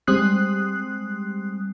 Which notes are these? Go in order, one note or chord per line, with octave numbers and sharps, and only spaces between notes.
G3 G#3 C4 D#6 F#6 C7